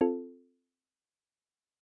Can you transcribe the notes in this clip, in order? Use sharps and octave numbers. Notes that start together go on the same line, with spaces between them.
C4 F4 A4